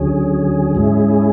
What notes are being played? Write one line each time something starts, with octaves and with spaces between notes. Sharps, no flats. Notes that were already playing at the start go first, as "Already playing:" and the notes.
Already playing: D2 D3 F#3 C#4 G#4
G#2 G#3 C#4 E4 G#4